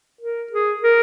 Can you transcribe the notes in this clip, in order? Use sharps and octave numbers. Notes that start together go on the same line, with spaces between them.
A#4
G#4
A#4